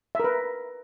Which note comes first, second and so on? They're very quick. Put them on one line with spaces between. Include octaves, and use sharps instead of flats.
E5 A#4 B4